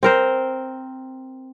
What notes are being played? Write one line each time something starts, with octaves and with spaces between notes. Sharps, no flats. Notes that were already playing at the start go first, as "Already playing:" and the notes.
C4 A#4 C5